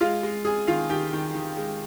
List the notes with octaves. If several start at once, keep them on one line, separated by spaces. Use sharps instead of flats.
G#3 F4 F5
G#3
G#3 G#4 G#5
D#3 F4 F5
D#3 G4 G5
D#3
D#3
G#3